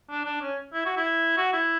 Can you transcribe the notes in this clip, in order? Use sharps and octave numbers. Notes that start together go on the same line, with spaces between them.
D4
D4
C#4
E4
F#4
E4
F#4
E4